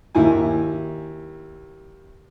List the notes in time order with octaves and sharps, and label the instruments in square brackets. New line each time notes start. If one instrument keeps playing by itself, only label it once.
[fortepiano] D#2 E4 G#5